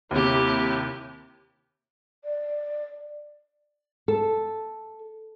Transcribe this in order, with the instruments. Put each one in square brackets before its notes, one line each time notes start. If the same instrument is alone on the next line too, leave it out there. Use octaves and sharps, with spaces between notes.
[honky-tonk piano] D#2 C3 [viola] E4 G4
[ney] D5
[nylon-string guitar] A4